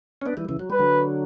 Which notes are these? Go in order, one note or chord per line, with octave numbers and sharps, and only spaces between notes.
C#4
B3 D4
E3 G3
C#3 E3
F#3
G3 B4
D3 F#3